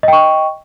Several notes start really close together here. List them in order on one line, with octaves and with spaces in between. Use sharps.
D#5 G5 C#6